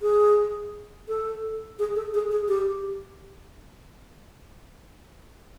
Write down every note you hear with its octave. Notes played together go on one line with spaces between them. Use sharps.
G#4
A4
G#4
A4
G#4
G#4
G4